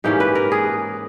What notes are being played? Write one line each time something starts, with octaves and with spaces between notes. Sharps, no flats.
G#2 E3 A#3 C#4 G4
B4
A#4
G#4